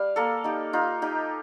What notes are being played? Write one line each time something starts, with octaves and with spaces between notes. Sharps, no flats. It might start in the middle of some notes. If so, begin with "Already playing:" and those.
Already playing: G3 F5
A#3 A4
D#4 G4
D#4 F4
D#4 G4